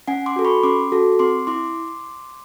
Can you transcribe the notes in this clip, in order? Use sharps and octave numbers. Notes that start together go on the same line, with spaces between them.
C#4 F#5 G#5
C6 D6
F#4 A4
B5 C#6
C#4 C6 D6
F#4 A4
C4 C6 D6
E4 C6 D6